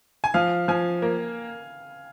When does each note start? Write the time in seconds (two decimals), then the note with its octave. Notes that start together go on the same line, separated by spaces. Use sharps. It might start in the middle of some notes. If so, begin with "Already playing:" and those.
0.24 G#5
0.34 F3 F5
0.68 F3 G#5
1.02 A#3